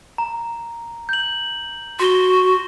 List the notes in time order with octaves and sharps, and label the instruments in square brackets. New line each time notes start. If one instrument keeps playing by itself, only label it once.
[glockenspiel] A#5
G6 F#7
[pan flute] F#4 [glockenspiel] C6 G7